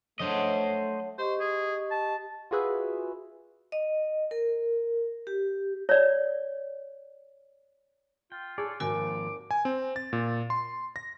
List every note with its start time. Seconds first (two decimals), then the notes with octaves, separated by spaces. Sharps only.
0.20 F#3 A3 D4 C5 D#5
1.18 G4 C5 D#5 C#6
1.40 G#4
1.91 A5
2.51 F4 F#4 G#4 B4 E5
3.72 D#5
4.31 A#4
5.27 G4
5.89 C#5 D5
8.32 F4 G5
8.58 G#4 A4 C#5 D5
8.80 G#1 F3 A#3 C4 F#4 A#4 G#5 D6
9.51 G#5
9.65 C4
9.96 A6
10.13 A#2
10.50 C6
10.96 A#6